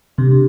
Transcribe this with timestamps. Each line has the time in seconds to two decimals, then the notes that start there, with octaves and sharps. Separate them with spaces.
0.18 C3 D4 G4
0.32 G4